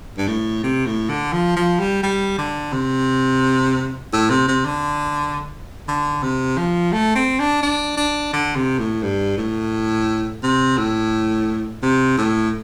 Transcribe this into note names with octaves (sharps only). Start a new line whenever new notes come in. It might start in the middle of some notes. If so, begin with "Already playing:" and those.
G2
A2
C3
A2
D3
F3
F3
G3
G3
D3
C3
A2
C3
C3
D3
D3
C3
F3
A3
C4
D4
D4
D4
D3
C3
A2
G2
A2
C3
A2
C3
A2